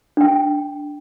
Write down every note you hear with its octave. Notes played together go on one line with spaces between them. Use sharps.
D4 G5